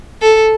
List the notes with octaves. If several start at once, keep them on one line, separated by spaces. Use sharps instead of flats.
A4